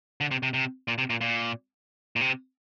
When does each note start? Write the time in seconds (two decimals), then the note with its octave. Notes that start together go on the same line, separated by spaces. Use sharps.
0.21 D3
0.31 C3
0.43 C3
0.54 C3
0.88 A#2
0.98 C3
1.10 A#2
1.21 A#2
2.16 A#2
2.21 C3